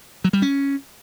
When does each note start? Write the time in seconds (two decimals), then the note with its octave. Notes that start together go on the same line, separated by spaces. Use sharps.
0.24 F#3
0.33 G3
0.42 C#4